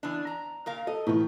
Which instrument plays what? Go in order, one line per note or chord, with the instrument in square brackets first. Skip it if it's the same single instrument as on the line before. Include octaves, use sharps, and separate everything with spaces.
[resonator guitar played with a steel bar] E3 B3 D4
A#5
A#2 A#4 F5
[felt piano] A4 [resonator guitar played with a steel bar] D#5
[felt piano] A2 E3 [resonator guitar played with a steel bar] D#3 B4